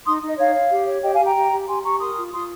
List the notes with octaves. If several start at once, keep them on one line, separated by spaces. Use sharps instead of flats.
D#4 C6 D#6
D#4
D#5
D#4 C#5 F5
C#5
G4
C#5
G4 D#5 G5
F5 G#5
G4
G5 A#5
G4
G4
G4 G#5 C6
G4 A#5 C#6
A#4 C6 D#6
F4
F4 C6 D#6